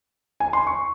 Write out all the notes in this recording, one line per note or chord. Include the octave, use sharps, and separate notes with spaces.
G#5
C6
C#6